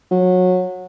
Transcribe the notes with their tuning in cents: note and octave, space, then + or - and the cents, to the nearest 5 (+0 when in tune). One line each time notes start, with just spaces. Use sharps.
F#3 -20